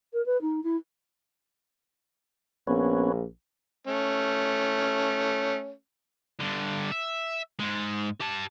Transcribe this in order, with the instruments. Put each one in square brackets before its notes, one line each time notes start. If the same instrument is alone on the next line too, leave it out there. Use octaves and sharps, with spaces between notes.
[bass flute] A#4
B4
D#4
E4
[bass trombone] A#1 [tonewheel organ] B3 C#4
[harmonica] A3 C#4
[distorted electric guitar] G2 D3
E5
G#2 G#3
G4 A5